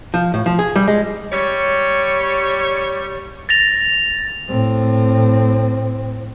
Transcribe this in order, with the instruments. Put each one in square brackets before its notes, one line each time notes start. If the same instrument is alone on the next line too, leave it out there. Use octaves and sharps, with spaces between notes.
[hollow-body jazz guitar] F3
A2
F3
G#4
G3
G#3
[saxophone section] G3 C#5
[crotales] A6 A#6 F7
[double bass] A2 C4